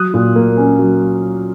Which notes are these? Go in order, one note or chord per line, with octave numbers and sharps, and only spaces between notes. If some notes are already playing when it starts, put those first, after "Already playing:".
Already playing: F#3 D#6 F#6
A#2
A#3
C#4
F#3